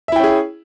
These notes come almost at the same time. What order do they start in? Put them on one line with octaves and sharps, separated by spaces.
E5 E4 G5 C#4 G#4